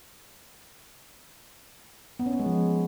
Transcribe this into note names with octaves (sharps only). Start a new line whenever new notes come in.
B3
C#4
B3
G#3
F3